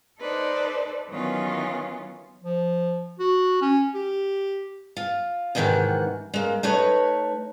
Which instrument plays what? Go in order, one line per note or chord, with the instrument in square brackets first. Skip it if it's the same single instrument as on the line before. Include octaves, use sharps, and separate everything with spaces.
[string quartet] D#4 A4 B4 C5 D5
D#3 E3 F#3 B3 C#4 F4
[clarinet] F3
F#4
C#4
G4
[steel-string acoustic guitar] F4
E2 G#2 C3 D#3 E3 F#5
G#3 A#3
A3 D#4 B4 C#5